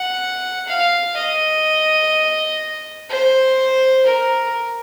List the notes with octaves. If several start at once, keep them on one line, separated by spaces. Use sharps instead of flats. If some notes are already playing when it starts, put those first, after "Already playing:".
Already playing: F#5
F5
D#5
C5
A#4